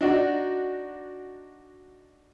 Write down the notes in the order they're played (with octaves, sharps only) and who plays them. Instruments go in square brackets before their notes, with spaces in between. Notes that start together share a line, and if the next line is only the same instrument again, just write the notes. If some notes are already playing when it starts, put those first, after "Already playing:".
[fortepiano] D4 D#4 F#4 D5